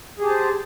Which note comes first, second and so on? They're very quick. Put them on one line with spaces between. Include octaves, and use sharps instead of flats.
G#4 G4 A5 C5